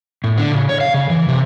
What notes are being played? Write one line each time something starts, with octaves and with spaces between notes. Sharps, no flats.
A2
D3
C#3
C#5
F5
C#3
E3
C3